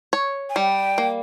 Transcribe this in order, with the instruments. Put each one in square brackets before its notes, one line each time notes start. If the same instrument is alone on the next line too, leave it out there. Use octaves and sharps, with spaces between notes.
[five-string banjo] C#5
[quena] G#5
[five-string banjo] G3 [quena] G5
[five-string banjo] A#3